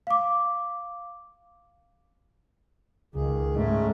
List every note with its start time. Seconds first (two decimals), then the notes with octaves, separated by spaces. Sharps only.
0.07 F5 D6
3.15 C#2 D#3 G#4
3.55 G#2 G#3 A3 C#4